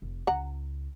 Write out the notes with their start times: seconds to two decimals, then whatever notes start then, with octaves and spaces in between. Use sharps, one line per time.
0.02 F1
0.27 C#2 F#5 A#5